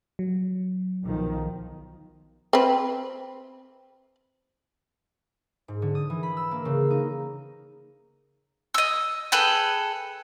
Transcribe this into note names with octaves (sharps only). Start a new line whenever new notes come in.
F#3
B1 D#3 F3
C4 B4
G#2
D3
D#6
E3
B5
E6
A#3
C#3
D#4
D#5 E6
G#4 A4 B4 G5